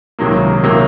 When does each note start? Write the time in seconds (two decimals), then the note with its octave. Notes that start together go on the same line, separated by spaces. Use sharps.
0.19 C#2 C3 D#3 F#3 A#3
0.64 C3 D#3 F#3 A#3